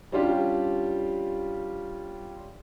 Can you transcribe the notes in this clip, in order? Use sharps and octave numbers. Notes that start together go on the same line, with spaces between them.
G3 C#4 D4 F4 G4